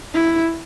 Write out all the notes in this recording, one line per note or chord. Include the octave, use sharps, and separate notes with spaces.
E4